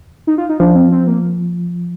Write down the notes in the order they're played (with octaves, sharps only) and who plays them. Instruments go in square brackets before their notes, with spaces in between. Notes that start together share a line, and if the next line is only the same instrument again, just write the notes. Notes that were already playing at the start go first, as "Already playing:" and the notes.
[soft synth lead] D#4
F4
D#4
[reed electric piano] F3 [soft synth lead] D4
[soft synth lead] C4
C4
A#3